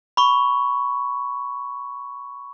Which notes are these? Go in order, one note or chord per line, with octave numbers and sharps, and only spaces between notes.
B5 C#6